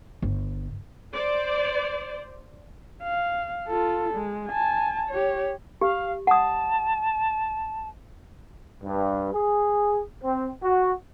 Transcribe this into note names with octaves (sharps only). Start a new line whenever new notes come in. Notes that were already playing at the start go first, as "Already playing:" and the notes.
G1
C5 D5
F5
F4 A4
G#3
G#5 A5
G4 C#5
G4 F5
F#5 A5 D#6
G2
G#4
C4
F#4